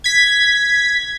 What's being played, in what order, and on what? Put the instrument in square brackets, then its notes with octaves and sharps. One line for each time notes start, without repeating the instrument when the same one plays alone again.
[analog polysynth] G#6 B6